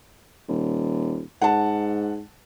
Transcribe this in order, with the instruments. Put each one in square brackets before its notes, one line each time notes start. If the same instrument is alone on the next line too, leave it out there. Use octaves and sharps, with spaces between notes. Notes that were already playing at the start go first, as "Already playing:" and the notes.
[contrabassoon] D#1
[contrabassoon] G#2 [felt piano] F#5 A5